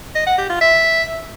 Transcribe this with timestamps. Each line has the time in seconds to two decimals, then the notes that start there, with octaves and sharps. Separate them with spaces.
0.15 D#5
0.27 F#5
0.38 G4
0.50 F4
0.61 E5